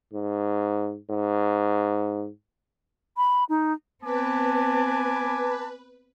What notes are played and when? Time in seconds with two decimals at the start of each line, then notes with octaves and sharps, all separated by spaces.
0.13 G#2
1.10 G#2
3.17 B5
3.49 D#4
4.04 B3 C4 B4 G#5 A5 D6